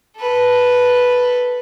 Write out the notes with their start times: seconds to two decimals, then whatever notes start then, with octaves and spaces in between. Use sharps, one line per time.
0.18 A4 B4